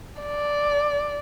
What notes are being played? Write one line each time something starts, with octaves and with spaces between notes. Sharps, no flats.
D5